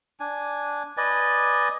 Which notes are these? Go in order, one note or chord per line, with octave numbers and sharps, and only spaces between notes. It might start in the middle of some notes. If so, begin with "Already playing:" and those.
D4 G#5
B4 D5 D#5 G#5